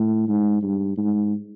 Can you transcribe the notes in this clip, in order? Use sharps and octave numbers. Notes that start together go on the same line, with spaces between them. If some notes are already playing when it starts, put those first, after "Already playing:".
Already playing: A2
G#2
G2
G#2